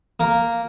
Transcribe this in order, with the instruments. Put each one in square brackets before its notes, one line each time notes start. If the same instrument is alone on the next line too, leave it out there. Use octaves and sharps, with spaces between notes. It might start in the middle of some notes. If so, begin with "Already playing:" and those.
[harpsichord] A#3